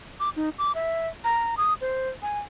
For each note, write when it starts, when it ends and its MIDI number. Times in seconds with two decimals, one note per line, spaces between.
0.20 0.30 86
0.36 0.50 63
0.58 0.72 86
0.75 1.08 76
1.24 1.55 82
1.57 1.74 87
1.81 2.09 72
2.22 2.40 80